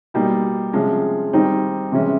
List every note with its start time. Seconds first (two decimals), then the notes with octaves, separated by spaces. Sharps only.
0.14 B2 G3 A#3 D#4
0.73 C3 F3 G#3 C#4
1.33 D#3 G3 C4 D#4
1.92 C3 E3 G#3 C#4